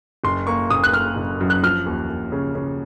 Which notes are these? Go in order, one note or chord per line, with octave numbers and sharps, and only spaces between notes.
F#1 C6
A#3 C#6
F#1 D#6
F#6
A#3 F6
F#1
F#2
F#6
F3 F6
D#2
D#2
C#3
C#3